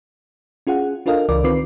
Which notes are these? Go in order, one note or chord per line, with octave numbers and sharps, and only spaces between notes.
C#4 F4 G#4 F#5
D4 F4 A4 A#4 D#5 F5
C#2 E3 A#4 D5 D6
D#3 C4 F4 B4 D6 C7